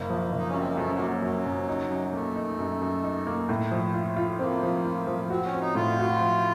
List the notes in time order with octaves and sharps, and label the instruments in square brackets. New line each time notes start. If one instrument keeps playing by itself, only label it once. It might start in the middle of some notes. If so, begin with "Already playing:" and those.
Already playing: [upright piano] F#1 [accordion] A#3
[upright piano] F3
F#1
[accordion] D#4
C#4
[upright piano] F#2 [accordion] C4
[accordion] A#3
[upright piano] F#2 [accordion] A3
[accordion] F3
F#3
[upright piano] A#3
[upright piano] F#2 [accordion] F#3
[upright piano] F#2
D#4
F#2
[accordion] A3 [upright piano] A#3
[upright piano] D#4
F#2
F#2
D#4
A#3
A2
F3
F4
F4
[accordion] A#3 [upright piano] C4
[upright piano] F3
F4
F3
[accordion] C4 [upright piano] F#4
[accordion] C#4
[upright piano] C4
[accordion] D#4
[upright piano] A2 [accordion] F4
[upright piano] F#4
F3